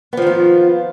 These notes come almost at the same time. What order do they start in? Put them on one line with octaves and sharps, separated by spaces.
B3 F3 D#3 F4